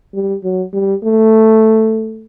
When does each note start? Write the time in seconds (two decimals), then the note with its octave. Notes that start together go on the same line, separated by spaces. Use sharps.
0.14 G3
0.44 F#3
0.73 G3
1.04 A3